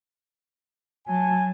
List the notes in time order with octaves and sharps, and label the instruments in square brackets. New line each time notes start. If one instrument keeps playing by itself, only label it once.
[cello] F#3 [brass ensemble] G#5 A5